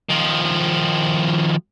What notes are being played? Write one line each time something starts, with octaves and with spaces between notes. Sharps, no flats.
D#3 F3